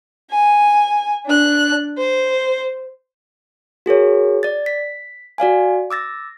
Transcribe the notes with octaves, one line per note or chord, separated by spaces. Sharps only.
G#5
D4 F#6
C5
F#4 G#4 A#4 C#5
D5 A6
B6
F#4 D5 F5 G#5
D6 E6 A6 A#6